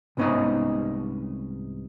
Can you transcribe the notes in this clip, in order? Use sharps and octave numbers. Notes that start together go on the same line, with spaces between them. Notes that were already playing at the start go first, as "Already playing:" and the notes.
C2 G#2 B3 C#4 D#4 D#5